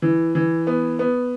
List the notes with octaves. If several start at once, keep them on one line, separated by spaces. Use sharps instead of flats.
E3
E3
B3
B3